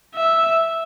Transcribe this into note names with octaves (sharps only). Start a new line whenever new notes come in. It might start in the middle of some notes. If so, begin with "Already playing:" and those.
E5